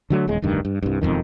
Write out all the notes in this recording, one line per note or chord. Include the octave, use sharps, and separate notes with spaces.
D3 F#3 A3
D#1 E2 C#3 G#3
F1 D2 G2 D#3
G2
C2 G2
E1 A1 F2 D#3